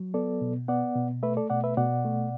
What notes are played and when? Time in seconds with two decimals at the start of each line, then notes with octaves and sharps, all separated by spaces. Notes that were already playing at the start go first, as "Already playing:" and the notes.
Already playing: F#3
0.14 B3 A4 D5
0.41 B2
0.68 B3 D5 F#5
0.96 B2
1.23 A3 B4 E5
1.37 A4 D5
1.50 B2 D5 F#5
1.64 B4 E5
1.77 B2 D5 F#5
2.05 A3